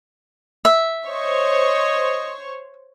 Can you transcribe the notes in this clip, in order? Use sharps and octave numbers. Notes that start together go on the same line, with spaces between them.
E5
C5 C#5 D#5 C#6